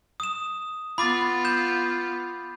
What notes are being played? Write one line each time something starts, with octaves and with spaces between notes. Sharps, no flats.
D#6 E7
B3 F4 B5 D6 A6
G6 E7